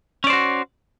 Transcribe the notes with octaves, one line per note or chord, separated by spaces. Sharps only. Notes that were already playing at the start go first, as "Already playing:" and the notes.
C#4 F#4 C5 D5